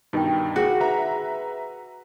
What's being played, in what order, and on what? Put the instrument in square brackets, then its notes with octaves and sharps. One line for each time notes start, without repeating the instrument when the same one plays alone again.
[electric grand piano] G2 B2 D#3 [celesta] D#4 G5
[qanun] F#4 [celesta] G#4
[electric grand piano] B4 E5 A#5